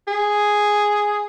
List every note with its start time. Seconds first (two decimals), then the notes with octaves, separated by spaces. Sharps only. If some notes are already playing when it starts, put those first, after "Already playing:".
0.08 G#4